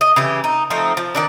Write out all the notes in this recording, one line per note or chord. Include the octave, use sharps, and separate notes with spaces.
D#5
C#3 E3 G4
D#4
F3 A3 C4 D#4
F3
D#3 D4 D5